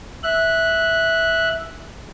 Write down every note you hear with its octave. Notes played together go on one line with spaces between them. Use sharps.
E5 F#6